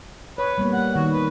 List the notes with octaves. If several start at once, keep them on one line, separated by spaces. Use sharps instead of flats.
B4 C#5
G3 A#3 B3
F#5
D#3 F#4
B4